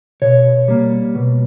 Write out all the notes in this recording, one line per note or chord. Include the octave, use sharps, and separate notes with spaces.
B2 C#5
G3 A#3
B2